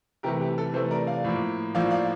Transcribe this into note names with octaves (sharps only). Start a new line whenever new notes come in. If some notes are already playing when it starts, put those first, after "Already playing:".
C3 E3 A3 G4 A#4
G4
A4
C3 E3 A3 A4 C5
A#4 D5
D5 F5
A2 F3 A#3
A2 F3 A#3 D5 F5
D5 F5